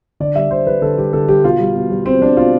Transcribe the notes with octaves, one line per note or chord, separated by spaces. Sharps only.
D3 D5
G3 E5
D3 C5
G3 B4
D3 A4
G3 G4
D3 A4
G3 G4
B2 F4
G3
B2
G3
B2 C4
G3 D4
B2 F4